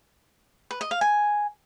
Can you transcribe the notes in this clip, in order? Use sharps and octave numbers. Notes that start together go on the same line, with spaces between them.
B4
D#5
F5
G#5